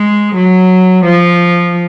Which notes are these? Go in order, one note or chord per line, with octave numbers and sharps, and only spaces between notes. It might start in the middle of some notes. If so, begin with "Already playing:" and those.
Already playing: G#3
F#3
F3